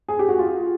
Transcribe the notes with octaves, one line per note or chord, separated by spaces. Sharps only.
G#4
G4
F#4
F4